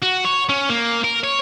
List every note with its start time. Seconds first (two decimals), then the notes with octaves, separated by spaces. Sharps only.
0.03 F#4
0.25 C#5
0.49 C#4
0.69 A#3
1.04 A#4
1.24 C#5